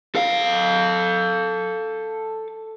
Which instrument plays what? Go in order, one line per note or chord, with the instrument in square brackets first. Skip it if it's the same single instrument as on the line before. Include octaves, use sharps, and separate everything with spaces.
[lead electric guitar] A4 F5